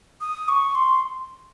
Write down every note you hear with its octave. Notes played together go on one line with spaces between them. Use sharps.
D#6
C#6
C6